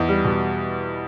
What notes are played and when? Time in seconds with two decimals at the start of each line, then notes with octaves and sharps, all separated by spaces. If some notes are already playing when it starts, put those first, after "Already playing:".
Already playing: E2 D#4
0.08 G3
0.25 B2